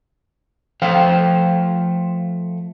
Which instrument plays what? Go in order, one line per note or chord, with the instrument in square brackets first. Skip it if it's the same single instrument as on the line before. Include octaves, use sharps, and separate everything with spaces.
[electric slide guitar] F3 A3 C5 F5 G5